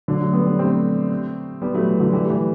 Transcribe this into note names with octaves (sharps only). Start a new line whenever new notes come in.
D3 F#3
F#3 A3
G3 B3
G3 B3
A3 C4
G3 B3
F#3 A3
E3
D3 F#3
E3 G3
A3
E3 G3